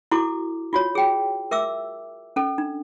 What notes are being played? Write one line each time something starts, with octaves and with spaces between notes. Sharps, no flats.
E4 F#4 A4 D6
F4 F#4 C#5
G#4 G5
A#4 E5 D6 E6
C#4 A4
D4